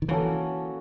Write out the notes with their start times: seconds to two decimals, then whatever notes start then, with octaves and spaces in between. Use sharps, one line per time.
0.02 D#3
0.09 E3 A#3 C#4 F#4 A4